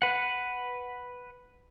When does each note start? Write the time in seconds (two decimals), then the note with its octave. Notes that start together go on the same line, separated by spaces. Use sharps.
0.02 B4 F#5